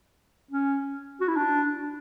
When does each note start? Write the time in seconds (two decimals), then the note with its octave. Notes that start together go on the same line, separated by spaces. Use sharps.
0.51 C#4
1.21 F#4
1.28 E4
1.36 D4